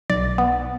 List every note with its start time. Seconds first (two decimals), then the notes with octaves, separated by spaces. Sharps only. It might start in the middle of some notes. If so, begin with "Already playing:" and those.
0.10 B1 D5
0.38 B3